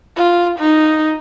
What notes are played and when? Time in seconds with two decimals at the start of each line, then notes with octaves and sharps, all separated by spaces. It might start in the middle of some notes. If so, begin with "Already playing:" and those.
0.16 F4
0.59 D#4